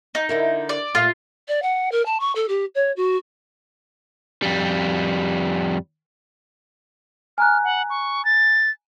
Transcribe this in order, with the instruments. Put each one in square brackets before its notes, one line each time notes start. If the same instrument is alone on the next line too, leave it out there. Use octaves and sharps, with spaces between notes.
[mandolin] D#4
[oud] D3 E4 A#4
[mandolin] D5
[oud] A#2 A3 [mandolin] F4
[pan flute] D5
F#5
A#4
A5
C#6
A4
G4
C#5
F#4
[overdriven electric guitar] F2 G3
[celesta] G#5 A#5 F#6 [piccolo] F6
[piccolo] F#5
C#6
A6